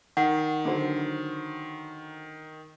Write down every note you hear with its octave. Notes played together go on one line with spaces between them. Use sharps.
D#3 F#5
D3 F#3 C5